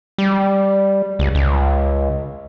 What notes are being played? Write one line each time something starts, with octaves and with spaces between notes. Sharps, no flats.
G3
C#2
C#2